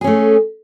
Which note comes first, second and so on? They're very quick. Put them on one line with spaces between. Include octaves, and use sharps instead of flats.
G#4 C#4 A3